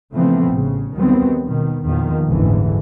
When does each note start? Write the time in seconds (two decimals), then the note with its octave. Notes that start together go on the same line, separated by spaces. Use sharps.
0.14 C#3 E3 F3 A3 B3 C4
0.49 A1 C#3
0.95 D#2 D#3 F#3 G3 B3 C4
1.44 B2 D#3
1.84 E2 A#2 D#3 F3
2.27 F#1 D2 G#2 D3 E3